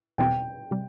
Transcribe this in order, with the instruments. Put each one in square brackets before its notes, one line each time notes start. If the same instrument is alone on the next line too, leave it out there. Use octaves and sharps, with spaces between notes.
[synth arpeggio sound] E2 B2 G3 C4 [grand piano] G5
[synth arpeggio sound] C3 G3